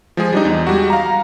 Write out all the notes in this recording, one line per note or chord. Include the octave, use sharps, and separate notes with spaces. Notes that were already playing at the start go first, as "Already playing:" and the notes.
F3 G#3 G#4
G3 D4 D#4
E2
G3 G#3 F#4
F5 A#5